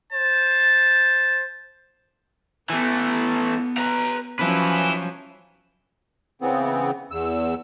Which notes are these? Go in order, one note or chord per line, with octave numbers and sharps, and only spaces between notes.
C5 A5
E3 A3 B3
B4 A#5
F3 F#3 C#4 E4 B4
C#3 E3 B3 C4
E2 E6